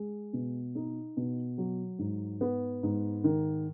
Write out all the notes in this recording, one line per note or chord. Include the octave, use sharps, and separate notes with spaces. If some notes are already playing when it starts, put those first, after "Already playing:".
Already playing: G#3
B2
D#4
B2
F#3
G#2
B3
G#2
D#3